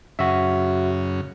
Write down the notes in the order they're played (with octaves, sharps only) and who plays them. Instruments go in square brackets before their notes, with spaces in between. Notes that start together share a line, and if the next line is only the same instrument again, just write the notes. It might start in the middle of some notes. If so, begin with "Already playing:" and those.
[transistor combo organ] F#2 C#3 [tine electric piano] F#4 E5